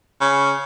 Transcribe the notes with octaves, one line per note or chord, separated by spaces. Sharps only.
C#3